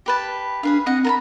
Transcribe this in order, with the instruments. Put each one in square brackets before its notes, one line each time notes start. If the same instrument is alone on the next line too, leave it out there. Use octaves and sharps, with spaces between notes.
[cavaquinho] G4 B4 A5
[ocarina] D4 [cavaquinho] G#4 B4 F5
[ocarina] C4 [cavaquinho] D#5 F#5
[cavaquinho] A#4 A5 B5